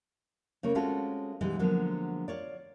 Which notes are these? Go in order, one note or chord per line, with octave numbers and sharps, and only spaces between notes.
C#3 A#3 C#5
G#3 C4 C#4 F4 F#4 A4
B2 E3 G3 G#3 D#4
D3 F3 F#3 G#3 A#3 B3
F4 C#5 D5